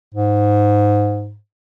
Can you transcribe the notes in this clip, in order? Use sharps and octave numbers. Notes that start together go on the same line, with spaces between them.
G#2